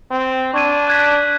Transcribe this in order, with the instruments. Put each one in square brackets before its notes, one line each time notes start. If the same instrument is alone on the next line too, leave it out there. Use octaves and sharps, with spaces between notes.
[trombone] C4
[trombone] D4 [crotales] C#6 G#6 D#7
[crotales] F#6 G#6 B6